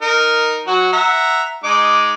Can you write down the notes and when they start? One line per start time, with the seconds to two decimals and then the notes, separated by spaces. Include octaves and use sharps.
0.02 D#4 A#4
0.67 F#3 F#4
0.92 E5 F#5 A#5
1.64 G#3 D#4 D6